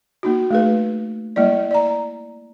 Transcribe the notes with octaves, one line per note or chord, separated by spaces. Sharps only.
A#3 D#4 F#4
A3 G#4 B4
G3 A#3 E4 D5
D5 A#5